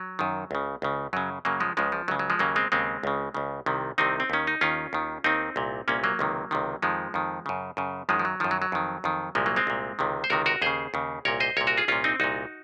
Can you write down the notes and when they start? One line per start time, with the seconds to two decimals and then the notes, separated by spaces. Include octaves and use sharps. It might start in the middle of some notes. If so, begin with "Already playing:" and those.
Already playing: F#3
0.19 F#2 D#3
0.51 C#2 C#3
0.82 C#2 C#3
1.13 F#2 C#3 F#3
1.45 F#2 C#3 F#3 A#3
1.60 F3 G#3
1.77 C#2 C#3 F3 G#3
1.92 F3
2.08 C#2 C#3 F#3
2.19 F#3
2.30 F3 G#3
2.39 D#2 C#3 F#3 A#3
2.56 G#3 C4
2.72 D#2 C#3 G#3 C4
3.03 C#2 C#3
3.34 C#2 C#3
3.66 C2 C3 D#3
3.98 C2 C3 D#3 C4 D#4
4.20 C4
4.30 D#2 D#3 C#4
4.47 D#4
4.61 D#2 D#3 C#4 F4
4.93 D#2 D#3
5.24 D#2 D#3 C4 D#4
5.56 C2 A#2
5.88 C2 A#2 A#3 C#4
6.04 F#3 A#3
6.19 C#2 C3 D#3
6.51 C#2 C3 D#3
6.82 F2 D#3 F3 G#3
7.14 F2 D#3
7.46 F#2 C#3
7.77 F#2 C#3
8.09 F#2 D#3 F3 G#3
8.19 F3
8.25 F#3
8.40 F#2 D#3 F3
8.51 F#3
8.62 F#3
8.72 F2 D#3
9.04 F2 D#3
9.35 C2 A#2 F3 G#3
9.46 F#3 A#3
9.56 G#3 C4
9.67 C2 A#2
9.99 C#2 C3 D#3
10.24 C5
10.30 C#2 C3 D#3 F#4 A#4
10.46 F#4 A#4
10.62 D#2 C#3 G#4 C5
10.94 D#2 C#3
11.25 C2 A#2 A#4 C#5
11.40 C5 D#5
11.57 C2 A#4 C#5
11.61 A#2
11.67 F#4 A#4
11.77 F4 G#4
11.88 C2 A#2 C#4 F4
12.04 C4 D#4
12.20 C2 A#2 D#4 F#4